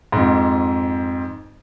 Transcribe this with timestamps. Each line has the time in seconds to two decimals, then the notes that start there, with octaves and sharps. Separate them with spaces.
0.12 F2 G#2